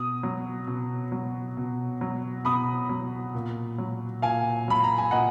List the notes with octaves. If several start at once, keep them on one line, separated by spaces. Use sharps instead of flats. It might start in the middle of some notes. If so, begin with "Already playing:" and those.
Already playing: B2 D#6
F#3
B2
F#3
B2
F#3
B2 B5 D#6
F#3
A#2
F#3
A#2 F5 G#5
F#3 B5
A#5
G#5
A#2 D#5 F#5